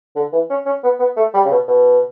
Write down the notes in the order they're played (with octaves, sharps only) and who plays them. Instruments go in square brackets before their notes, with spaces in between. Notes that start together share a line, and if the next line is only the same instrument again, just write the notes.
[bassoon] D3
E3
C#4
C#4
B3
B3
A3
G3
C#3
B2
B2